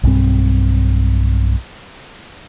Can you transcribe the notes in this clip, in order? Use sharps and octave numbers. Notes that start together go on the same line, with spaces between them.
B1 G2 C4